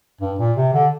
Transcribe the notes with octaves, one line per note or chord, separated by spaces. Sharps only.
G2
A#2
C3
D3